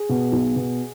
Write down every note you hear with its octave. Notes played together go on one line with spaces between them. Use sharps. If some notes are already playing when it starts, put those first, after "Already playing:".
Already playing: G#4
B2
B1
B2